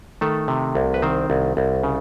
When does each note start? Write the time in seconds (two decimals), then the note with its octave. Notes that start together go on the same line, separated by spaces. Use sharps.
0.21 D#3 A3 A4
0.48 C3
0.75 C2
0.94 B4
1.02 D#3 C4 C5
1.30 C2
1.57 C2
1.83 C#3